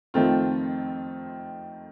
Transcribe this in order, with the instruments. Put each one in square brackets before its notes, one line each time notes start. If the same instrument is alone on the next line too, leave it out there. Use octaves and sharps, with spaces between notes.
[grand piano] F2 D#3 A3 C4 F4